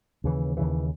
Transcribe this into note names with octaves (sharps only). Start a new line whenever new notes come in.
D#2 C#3 E3
D#2 C#3 E3